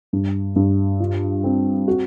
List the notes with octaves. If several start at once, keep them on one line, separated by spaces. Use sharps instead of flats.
G2
G2
F4
C4
F#4